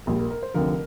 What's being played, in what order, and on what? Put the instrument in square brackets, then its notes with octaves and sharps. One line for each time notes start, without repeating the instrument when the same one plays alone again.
[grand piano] A#1 A#2 G3 A#4
A#4
A#4
C5
F1 F2 D3 F3 A#4